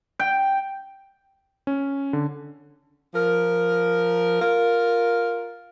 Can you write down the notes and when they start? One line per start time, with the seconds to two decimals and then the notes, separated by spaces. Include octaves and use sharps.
0.19 G5
1.67 C#4
2.13 D3
3.14 F3 A#4
4.41 F4 A#4